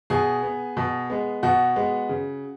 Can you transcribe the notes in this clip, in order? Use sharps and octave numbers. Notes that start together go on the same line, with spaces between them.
B2 G#4
B3
B2
G#3 B3
B2 F#4
G#3 B3
C#3